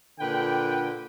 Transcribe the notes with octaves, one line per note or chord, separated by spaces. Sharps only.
A#2 D3 B4 G5